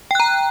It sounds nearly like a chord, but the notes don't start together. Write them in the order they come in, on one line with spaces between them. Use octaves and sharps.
G5 F#6 A#5